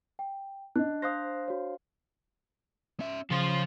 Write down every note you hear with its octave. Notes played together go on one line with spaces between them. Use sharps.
G5
D4 D#5 F#6
C5 F5 D#6 F#6 A#6
F#4 C#5
C#4 E5
C#3 F3 C5